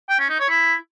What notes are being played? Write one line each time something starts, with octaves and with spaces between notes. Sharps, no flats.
G5
C#4
D#4
C#5
E4